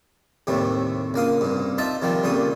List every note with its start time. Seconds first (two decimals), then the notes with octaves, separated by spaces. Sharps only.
0.47 D#2 A2 C3 G3 A3
1.14 C#2 A#3 F5 D#6
1.41 C2 G2
1.78 D#4 F4 D#5 E5 A5
2.02 C3 D#3 F3 G3
2.23 C#2 A#2 G3 A3 D#6